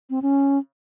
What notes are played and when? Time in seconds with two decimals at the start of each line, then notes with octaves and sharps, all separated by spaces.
0.10 C4
0.22 C#4